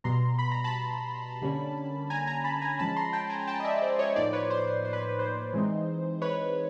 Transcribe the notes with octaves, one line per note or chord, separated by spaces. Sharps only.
B2 G3 B3 A#5 C6
B5
A#5
A5 B5
D3 G3 A#3 C#4
G#5 A#5
G#5 A#5
A5 B5
G#5 A#5
F3 G#3 C#4 A5 B5
A#5 C6
G5 A5
G#5 A#5
G5 A5
D#5
D5 E5
C5 D5
C#5 D#5
A2 F3 A#3 D#4 C5 D5
B4 C#5
C5
C5
C5
B4
B4
C5
E3 G#3 C4 D#4
B4 C#5